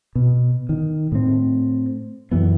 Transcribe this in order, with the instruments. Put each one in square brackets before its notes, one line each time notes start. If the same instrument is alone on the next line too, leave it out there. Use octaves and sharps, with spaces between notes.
[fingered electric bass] B2
D#3
A2 C4
F#2 E3 B3